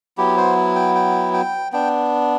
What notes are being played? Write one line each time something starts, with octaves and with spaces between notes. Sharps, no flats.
F#3 B3 E4 G4
C5
G5
G5
G5
B3 D4 G5